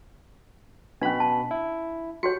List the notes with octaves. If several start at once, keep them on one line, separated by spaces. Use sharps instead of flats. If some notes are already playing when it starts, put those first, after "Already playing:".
B2 C#4 D4 B5
A5
E4
F#4 G4 C#5 C#7